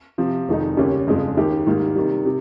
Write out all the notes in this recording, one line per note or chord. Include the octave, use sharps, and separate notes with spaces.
C3 F3 C4
F1 F2 D#3 G#3 D#4
D#2 C#3 G3 C#4 G4
G1 F2 C#3 F3 G#3
D#2 D#3 G#3 D#4 G4
G#2 D#3 G3 A#3
C3 D#3 G3
C3